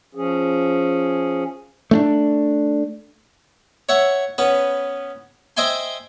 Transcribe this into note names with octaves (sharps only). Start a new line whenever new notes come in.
F3 C#4 G#4
A3 C#4 D4
C#5 E5 F#5
B3 C#4 B4
C5 D#5 E5 G5 G#5 C6